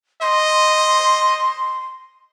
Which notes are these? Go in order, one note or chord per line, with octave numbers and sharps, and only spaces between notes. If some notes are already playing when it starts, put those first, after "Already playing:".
D#5 C6